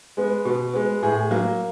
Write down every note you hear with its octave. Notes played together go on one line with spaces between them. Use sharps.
G#3 B3
B2
G#3 B3
A2 G#4
F#3 A#3